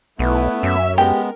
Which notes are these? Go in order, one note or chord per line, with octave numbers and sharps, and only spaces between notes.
B1 A3 B3 E4 B4
F#2 C#4 E5
G#3 B3 G4 A#4